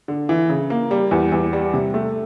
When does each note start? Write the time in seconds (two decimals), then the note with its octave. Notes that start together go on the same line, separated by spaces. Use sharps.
0.08 D3
0.29 E3
0.50 C#3
0.70 A#3
0.91 G3
1.11 E2
1.32 E2
1.53 G3
1.74 C3
1.94 A3